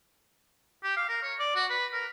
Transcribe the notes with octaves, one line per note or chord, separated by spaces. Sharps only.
G4
F5
A#4
C#5
D5
F#4
B4
A#4